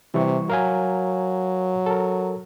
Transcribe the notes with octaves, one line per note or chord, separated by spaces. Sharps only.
C3 E3 G3 C#6
F#3 A#4 F5 G#5
A4 A#4